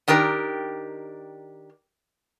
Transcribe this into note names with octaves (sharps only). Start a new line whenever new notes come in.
D#3 D4 G4 A#4